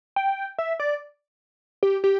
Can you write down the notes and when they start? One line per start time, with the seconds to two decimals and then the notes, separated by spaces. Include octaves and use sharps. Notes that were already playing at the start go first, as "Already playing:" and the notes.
0.16 G5
0.58 E5
0.80 D5
1.83 G4
2.04 G4